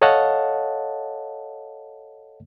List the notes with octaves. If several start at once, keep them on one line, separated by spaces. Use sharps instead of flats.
A4 C#5 D#5 F5 F#5 A5